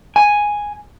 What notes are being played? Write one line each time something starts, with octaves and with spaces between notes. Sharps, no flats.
G#5